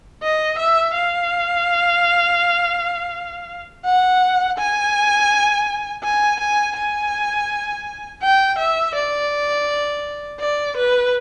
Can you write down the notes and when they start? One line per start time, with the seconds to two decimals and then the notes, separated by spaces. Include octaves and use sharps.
0.23 D#5
0.59 E5
0.95 F5
3.86 F#5
4.58 G#5
6.04 G#5
6.40 G#5
6.77 G#5
8.23 G5
8.59 E5
8.95 D5
10.40 D5
10.77 B4